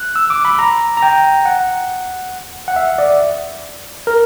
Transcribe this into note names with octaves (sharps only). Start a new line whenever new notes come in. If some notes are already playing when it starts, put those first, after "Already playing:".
Already playing: F#6
E6
D6
B5
A#5
A#5
G5
F#5
F#5
E5
D5
A#4